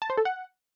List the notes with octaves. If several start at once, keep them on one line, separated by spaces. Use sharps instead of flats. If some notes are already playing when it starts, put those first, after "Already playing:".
A5
C5
A4
F#5